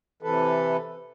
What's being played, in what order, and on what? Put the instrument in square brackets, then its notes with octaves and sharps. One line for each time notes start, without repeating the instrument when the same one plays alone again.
[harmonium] C3 E3 A4 B4